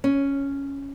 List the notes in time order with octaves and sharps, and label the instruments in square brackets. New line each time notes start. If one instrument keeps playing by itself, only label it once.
[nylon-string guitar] C#4